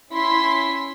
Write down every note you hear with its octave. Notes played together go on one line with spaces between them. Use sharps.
C#4 E4 C6 B6